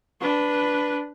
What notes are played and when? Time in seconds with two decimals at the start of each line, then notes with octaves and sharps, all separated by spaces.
0.21 D4 B4